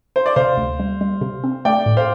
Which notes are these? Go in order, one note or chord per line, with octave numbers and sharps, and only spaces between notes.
C5
D5
C3 C5 F5
D2
G3
G3
C3
C4
A3 D5 G5
A2
C5 F5